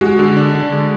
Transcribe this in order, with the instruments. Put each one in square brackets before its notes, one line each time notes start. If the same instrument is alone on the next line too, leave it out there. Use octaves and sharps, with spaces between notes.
[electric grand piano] G#3 [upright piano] F#4
[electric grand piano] D3
D4
D3
G#3